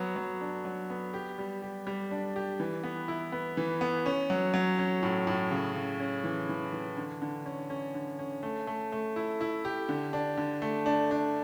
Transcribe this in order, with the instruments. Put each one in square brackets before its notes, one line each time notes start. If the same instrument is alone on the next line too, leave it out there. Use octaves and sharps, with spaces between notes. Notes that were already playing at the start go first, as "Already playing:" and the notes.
Already playing: [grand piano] F#3 B3
F#3
D4
F#3
B3
G4
G3
G4
G3
D4
G4
E3
B3
E4
B3
E3
B3
C#4
F#3
F#3
C#4
A2
A2
C#3
C#3
C#4
E3
E3
E3
D3
D3
C#4
C#4
D3
C#4
A3
A3
A3
E4
E4
G4
D3
D4
D3
A3
D4
D4